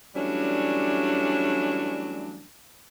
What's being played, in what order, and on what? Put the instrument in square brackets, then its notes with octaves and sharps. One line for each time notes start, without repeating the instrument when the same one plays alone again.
[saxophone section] E3 F#3 G3 A3 C#4 D4